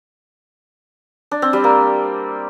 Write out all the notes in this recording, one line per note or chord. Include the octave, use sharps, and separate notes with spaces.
D4
C4
G3
A#3